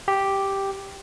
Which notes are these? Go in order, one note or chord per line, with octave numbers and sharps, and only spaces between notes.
G4